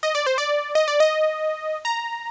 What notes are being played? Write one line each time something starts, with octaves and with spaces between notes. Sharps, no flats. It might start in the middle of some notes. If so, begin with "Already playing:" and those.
D#5
D5
C5
D5
D#5
D5
D#5
A#5